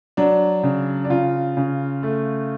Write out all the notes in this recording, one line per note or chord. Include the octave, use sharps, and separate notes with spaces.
F#3 D4
C#3
D4
C#3 F4
C#3
A3